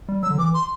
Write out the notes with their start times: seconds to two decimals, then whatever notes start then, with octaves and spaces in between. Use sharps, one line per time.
0.09 G3
0.23 F#3 E6
0.31 D3
0.38 E3 D6
0.54 C6